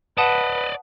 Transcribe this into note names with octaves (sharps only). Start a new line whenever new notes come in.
B4 D5 D#5 F#5 A5 D#6